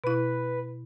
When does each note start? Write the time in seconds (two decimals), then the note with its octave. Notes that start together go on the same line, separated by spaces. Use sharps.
0.04 B2 E4 B4